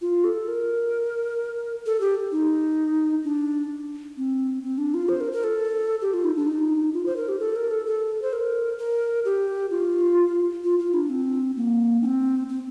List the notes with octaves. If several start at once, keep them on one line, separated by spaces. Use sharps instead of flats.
F4
A4
A#4
A4
G4
D#4
D4
C4
C4
D4
F4
C5
A#4
A#4
A4
G4
F4
D#4
D4
D#4
F4
C5
A#4
G4
A4
A#4
A4
A4
C5
A#4
A#4
G4
F4
F4
F4
D4
C4
A#3
D4
C4
C4